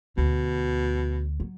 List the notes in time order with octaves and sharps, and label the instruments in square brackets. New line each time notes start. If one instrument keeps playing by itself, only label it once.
[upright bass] D2 [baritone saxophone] B2
[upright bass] F#3